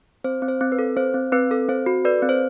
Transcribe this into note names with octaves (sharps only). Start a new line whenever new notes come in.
C4 C5
C4
C5
C4
B4
A4
C4 C5
C4
C4 B4
A4
C4 C5
F#4
A4 B4 D5
C4
C5